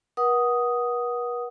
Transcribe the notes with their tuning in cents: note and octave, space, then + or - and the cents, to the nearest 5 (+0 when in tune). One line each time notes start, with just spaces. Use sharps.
B4 -45 F#5 +0 D#6 +0